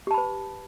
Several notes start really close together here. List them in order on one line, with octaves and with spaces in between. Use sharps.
G4 A5 B5 B4